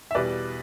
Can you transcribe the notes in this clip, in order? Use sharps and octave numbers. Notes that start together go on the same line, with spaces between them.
E5
E2 B2 G3 B4 D5